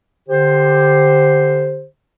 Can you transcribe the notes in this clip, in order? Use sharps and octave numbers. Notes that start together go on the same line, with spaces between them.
D3 G4 C5